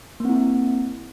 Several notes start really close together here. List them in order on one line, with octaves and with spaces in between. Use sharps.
A#3 C4 E4